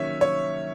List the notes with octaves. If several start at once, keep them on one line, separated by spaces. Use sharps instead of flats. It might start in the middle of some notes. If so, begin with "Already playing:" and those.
Already playing: D#3 F#3 A#3 C#4 C#5 E5
C#5